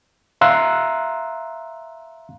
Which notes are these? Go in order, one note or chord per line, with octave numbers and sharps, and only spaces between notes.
E5 F5 A#5 C6 E6 F#6